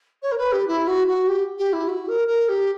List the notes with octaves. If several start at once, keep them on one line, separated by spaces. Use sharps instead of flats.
C#5
A#4
B4
G4
E4
F#4
F#4
G4
G4
E4
F#4
A#4
A#4
G4